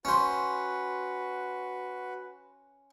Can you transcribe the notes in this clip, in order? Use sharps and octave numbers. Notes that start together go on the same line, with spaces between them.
C#4 F#4 B4 C5